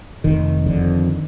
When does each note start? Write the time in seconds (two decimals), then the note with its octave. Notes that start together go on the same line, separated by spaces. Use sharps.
0.24 F1 D#3
0.66 F2 D3